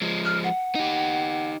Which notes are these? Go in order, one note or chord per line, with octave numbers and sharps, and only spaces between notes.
F3 G#3
F6
F#5
D#4 G4